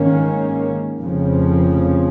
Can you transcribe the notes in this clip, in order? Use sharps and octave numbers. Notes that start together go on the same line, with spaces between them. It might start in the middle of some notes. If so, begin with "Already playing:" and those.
Already playing: G#2 D#3 A#3 C#4
F1 F2 C#3 F3